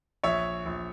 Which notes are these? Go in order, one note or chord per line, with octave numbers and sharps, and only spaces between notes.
A#1 C#5 E5
A#1